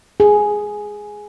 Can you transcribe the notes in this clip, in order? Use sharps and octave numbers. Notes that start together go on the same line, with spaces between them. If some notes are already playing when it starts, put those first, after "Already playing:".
G#4